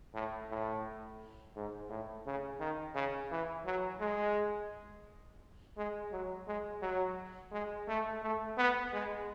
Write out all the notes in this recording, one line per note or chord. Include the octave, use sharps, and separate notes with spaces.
A2
A2
G#2
A2
C#3
D#3
C#3
E3
F#3
G#3
G#3
F#3
G#3
F#3
G#3
A3
A3
B3
G#3